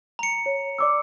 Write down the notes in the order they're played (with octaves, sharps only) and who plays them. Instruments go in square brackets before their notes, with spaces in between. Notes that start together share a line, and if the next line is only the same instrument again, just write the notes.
[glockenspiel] A#5 C#7
[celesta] C#5
D5 D6 E6